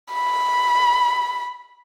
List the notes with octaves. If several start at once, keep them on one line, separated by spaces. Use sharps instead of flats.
B5